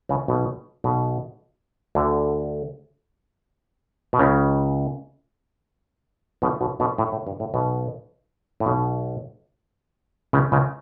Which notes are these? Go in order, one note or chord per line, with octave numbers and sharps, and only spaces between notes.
C#2 C#3
B1 B2
B1 B2
D2 D3
B2
C#2 C#3
B1 B2
B1 B2
B1 B2
A2
A2
G2
A2
B1 B2
A2
B1 B2
C#2 C#3
C#2 C#3